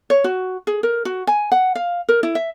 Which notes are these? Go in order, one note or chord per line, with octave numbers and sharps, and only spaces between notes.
C#5
F#4
G#4
A#4
F#4
G#5
F#5
F5
A#4
E4
E5